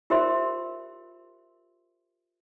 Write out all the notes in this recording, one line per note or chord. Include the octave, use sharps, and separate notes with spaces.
F4 G4 A#4 C5 E5 C6